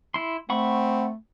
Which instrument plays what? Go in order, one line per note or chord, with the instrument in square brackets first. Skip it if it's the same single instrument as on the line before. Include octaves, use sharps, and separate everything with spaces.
[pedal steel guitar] E4 C6
[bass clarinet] A3 [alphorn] C4 [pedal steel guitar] F#5 B5 C#6